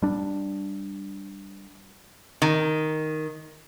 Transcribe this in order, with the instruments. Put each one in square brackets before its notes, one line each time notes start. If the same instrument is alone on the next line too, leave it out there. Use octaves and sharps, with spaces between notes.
[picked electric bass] G3 D4
[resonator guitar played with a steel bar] D#3